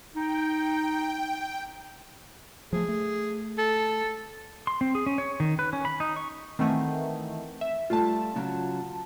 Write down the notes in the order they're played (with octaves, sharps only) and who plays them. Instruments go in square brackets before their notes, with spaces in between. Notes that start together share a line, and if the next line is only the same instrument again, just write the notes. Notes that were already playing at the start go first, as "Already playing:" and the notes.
[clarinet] D#4 [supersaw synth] G5
[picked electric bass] F3 A3 [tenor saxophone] G#4
[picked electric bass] A3
[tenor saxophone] A4
[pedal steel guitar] C6
C4
G#4
C#4
C#5
D#3
B4
C#4
B5
D#4
C#6
[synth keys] D#3 E3 A3 [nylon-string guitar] C4 F#5 G#5
[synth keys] E5
[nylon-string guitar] G3 A3 [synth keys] F4 A5
[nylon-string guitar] C#3 F#3 F#4